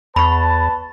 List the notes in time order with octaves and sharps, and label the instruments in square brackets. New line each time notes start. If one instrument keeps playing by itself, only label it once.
[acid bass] E2 [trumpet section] B4 A5 [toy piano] B5 C#6